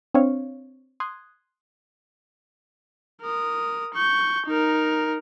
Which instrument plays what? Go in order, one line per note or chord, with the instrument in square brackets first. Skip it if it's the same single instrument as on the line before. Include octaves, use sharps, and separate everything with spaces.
[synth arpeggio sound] C4 D4 C#5 F5
C6 D#6 F#6 G#6
[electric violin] A#4 D#6
C#6 G6
D#4 A#4